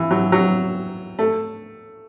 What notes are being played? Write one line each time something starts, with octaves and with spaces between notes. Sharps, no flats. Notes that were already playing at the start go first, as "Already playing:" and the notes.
Already playing: E3
F#3
F#3
A3